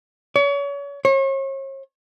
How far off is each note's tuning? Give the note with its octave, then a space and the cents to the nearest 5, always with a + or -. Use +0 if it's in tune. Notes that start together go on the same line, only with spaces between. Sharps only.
C#5 +35
C#5 -40